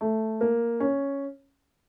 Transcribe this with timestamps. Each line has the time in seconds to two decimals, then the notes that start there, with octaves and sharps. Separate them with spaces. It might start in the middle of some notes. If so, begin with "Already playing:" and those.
0.01 A3
0.41 A#3
0.80 C#4